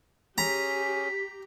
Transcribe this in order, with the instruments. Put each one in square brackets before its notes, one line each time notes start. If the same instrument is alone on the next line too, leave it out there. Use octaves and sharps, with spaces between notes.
[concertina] C#4 G#4 [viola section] G4 [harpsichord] A#5 [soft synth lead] B6